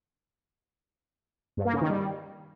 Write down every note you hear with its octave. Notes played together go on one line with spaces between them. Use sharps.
G2
A#3
C#3
D#3
G3